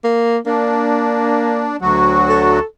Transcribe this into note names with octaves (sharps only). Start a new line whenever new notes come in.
A#3
A#3 D4
D2 F#3 F#4
A4